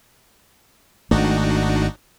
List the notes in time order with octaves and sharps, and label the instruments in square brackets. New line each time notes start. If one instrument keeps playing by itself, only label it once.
[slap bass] G#1 A3 [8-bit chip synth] D4 D#4 F#4